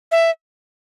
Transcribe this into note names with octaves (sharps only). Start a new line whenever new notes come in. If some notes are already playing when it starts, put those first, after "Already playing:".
E5